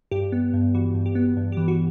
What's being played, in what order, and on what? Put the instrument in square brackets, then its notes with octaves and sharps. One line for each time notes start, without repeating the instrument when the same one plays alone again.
[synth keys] G2 G4
B3
G2
E3 F#4
G2
G4
B3
G2
E3 G4
F#4